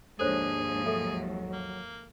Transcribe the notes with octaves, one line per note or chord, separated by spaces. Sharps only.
D#2 G#2 F3 D4 G#4 A4 C5 C#5
F#3 A4 E5
A#3